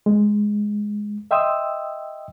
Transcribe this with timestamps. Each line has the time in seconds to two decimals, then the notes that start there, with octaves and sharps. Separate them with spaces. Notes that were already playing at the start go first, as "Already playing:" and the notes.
0.06 G#3
1.31 D#5 E5 G5 C6 D#6 E6